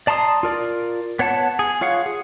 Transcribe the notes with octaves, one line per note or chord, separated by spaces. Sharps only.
D5 A5 A#5 C6 D#6
F4 A#4 D5
B3 C#5 F#5 A5
G#4
F4 C#5 F5 F#5
G#4